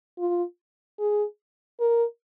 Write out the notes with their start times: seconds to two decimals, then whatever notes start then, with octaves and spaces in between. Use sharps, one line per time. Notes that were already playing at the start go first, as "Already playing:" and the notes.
0.18 F4
0.99 G#4
1.80 A#4